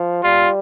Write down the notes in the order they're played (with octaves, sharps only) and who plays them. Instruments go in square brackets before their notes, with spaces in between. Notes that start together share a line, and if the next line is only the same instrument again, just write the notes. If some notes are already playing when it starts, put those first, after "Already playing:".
Already playing: [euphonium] F3
[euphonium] G3 [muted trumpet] F4